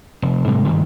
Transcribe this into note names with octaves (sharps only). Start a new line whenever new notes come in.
F1
G#2 C3 G3 G#3
G2 D#3 E3